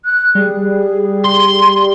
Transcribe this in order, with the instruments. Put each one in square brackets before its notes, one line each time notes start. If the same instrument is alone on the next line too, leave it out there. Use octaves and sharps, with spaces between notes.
[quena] F#6
[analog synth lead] G3 [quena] G#4
[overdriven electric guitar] C6